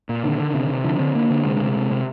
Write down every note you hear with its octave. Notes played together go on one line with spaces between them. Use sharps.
A#2
D3 D#3
D3
C3
C3
D3 F3
D3 C4
D3 A#3
D3
C3 G#3
C3
C3
C3